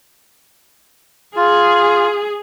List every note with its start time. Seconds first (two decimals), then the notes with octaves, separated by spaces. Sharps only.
1.36 F4 G#4